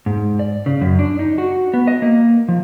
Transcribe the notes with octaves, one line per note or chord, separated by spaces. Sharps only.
G#2
D5
C#3
F#2
D4
D#4
F#4
B3
D#5
A#3
F3